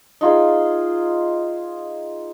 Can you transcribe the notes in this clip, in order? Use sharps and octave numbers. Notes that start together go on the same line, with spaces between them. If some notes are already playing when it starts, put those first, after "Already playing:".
D#4 F4 G#4